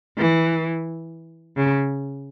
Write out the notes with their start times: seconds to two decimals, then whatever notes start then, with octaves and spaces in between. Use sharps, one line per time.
0.17 E3
1.57 C#3